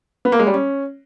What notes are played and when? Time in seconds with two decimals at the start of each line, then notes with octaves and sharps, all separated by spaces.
0.25 B3
0.32 A#3
0.39 G#3
0.47 G3
0.54 C#4